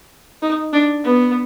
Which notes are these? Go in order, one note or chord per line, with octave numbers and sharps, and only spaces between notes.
D#4
D4
B3